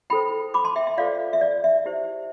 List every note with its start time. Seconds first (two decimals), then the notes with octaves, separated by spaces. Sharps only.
0.10 E4 A4 C5 G5 B5
0.54 B5 D6
0.65 A5 C6
0.76 E5 G5
0.87 E5
0.98 F4 A4 C5 D5 F5
1.33 E5
1.41 D5
1.64 E5
1.86 E4 G4 C5